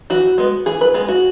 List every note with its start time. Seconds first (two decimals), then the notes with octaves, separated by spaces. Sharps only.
0.10 E3 F#4
0.38 G#3 B3
0.66 E3 G#4
0.81 B4
0.94 G#3 B3 G#4
1.08 F#4